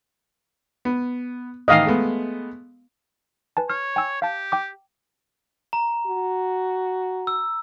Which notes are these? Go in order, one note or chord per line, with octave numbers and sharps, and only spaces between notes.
B3
A1 D#3 E3 D#5 F5
G#3 A3 B3
B4 G#5 A5
C#5 F6
G5 G#5 E6
G4 F5 A5
G5 D6
A#5
F#4
E6